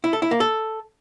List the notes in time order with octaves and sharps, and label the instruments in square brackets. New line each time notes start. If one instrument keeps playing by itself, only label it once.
[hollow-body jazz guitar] E4
A4
E4
A#3
A4